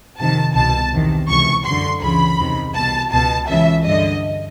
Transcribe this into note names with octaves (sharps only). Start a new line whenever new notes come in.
F2 C3 D#3 A5
C2 B2 A5
E2 C3 D#3
C#2 C3 E3 C#6
F#2 D3 C6
C#2 C#3 E3 B5
E2 C3 D#3
C2 B2 A5
C#2 B2 A5
C#2 C#3 E3 E5
G2 D3 D#5